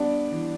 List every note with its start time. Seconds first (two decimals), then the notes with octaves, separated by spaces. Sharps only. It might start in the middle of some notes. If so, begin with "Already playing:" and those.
Already playing: G3 B3 D4 D5
0.31 E3